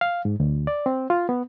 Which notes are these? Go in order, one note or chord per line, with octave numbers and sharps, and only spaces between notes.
F5
G#2
D2
D5
C4
F4
B3